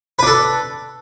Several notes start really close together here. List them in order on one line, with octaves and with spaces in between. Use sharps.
B4 D4 A4